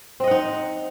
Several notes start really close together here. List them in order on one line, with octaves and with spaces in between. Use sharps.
C4 D#5 F#5 D#4